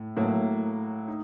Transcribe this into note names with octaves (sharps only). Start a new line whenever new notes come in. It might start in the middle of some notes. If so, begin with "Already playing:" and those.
Already playing: A2
A2 F#3 A#3
D#4